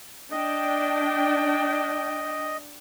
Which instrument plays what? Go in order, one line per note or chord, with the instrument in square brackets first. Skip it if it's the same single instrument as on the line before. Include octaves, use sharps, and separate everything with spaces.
[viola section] D4 G5 [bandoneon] D#5